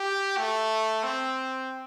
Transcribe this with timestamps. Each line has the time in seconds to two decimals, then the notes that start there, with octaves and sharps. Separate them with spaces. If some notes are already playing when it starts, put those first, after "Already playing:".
Already playing: G4
0.38 A3
1.04 C4